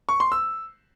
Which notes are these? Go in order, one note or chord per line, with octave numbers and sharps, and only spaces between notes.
C#6
C6
E6